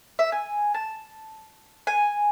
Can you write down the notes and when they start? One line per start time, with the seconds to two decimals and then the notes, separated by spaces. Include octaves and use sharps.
0.19 E5
0.32 G#5
0.74 A5
1.87 G#5